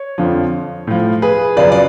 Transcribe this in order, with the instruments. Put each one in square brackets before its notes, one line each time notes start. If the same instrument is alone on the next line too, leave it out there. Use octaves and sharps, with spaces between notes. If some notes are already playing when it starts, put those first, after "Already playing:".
Already playing: [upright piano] C#5
F2 D3 F3
A2 F3
G#4 B4
F#2 C#3 F3 B4 D5
D5